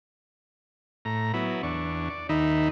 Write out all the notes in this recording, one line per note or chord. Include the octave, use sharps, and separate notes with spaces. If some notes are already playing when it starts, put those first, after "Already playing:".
A2 A#5
F#3 B3 E4
E2 D4 C#6
D5
D#2 D#3 D#4 E5 B5